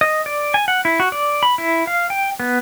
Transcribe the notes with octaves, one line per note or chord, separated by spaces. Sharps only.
D#5
D5
G#5
F#5
E4
F#4
D5
B5
E4
F5
G5
B3